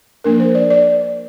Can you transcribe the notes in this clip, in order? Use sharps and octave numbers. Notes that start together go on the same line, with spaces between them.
F3 A#3 D4 A#4
C5
D5
D5